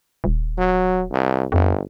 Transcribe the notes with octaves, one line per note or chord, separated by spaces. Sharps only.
D#1
F#3
C2
G1 F2